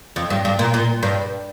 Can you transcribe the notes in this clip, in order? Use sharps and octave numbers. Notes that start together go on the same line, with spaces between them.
F2
G2
G2
A#2
A#2
G2